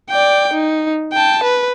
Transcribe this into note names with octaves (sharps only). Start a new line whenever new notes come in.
D5 G5
D#4
G5 A5
B4